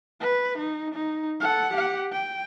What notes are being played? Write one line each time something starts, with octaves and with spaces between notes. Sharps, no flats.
B4
D#4
D#4
A4 F#5
G4 F#5
G5